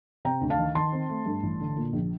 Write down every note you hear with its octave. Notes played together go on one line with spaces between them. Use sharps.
C3 G5 A#5
D2
F5 A5
D#3
D#3 A5 C6
C4
A3
G2
A1
D3
A#2
A#1